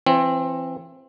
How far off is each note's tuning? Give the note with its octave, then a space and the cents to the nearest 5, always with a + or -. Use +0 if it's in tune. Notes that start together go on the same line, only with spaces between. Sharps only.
E3 +40 C4 +20